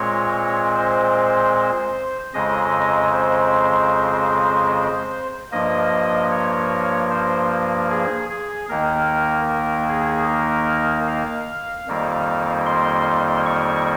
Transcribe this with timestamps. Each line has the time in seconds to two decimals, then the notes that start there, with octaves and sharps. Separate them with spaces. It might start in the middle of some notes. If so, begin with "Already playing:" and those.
Already playing: A#2 G#3 C4 C#5
0.75 C5
2.34 F2 C#3 G#3 C4 D#5
3.13 C5
5.52 G2 F3 A#3 D#5
6.31 C#5
7.10 C5
7.90 G#4
8.30 G#4
8.69 D#2 D#3 A#3 A#4
9.48 A#4
9.89 G#4
10.28 A#4
11.08 F5
11.87 F2 D#3 G3 A#3
12.66 C6
13.46 C#6